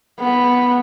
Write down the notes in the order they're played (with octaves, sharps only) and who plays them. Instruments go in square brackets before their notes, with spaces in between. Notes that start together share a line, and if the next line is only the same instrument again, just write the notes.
[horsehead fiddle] B3